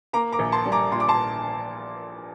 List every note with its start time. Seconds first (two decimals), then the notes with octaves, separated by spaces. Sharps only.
0.13 A#3 A#5 D6
0.32 A#5 D6
0.39 A#1
0.52 A5 C6
0.66 G3
0.72 A#5 D6
0.91 A#2 C6
1.00 D6
1.08 A5 C6